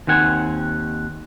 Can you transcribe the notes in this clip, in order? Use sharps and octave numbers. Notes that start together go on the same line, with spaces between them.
D#2 D#3 C4 F#5 G#5